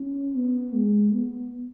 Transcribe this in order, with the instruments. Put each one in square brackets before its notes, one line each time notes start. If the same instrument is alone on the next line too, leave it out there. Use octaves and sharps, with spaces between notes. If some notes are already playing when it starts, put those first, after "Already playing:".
Already playing: [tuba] C#4
B3
G#3
B3